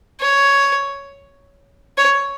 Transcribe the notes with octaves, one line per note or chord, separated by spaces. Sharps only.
C#5
C#5